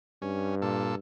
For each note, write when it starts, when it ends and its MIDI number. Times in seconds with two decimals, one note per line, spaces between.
0.22 0.97 43
0.22 0.55 61
0.62 0.96 46
0.62 0.96 69